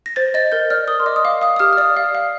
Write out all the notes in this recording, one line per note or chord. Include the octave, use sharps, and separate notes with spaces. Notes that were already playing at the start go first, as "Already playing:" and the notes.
A#6
C5 A6
D#5 A6
A#4 G6
D5 F6
A#4 D#6
C6
D#5 D6
D#6
F5 D6
F5 D#6
D#6
G4 F6
F6
D5 D#6
F5
F5